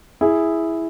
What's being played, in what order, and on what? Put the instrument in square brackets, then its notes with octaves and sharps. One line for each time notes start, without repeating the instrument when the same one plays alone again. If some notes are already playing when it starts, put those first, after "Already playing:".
[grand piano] E4 G#4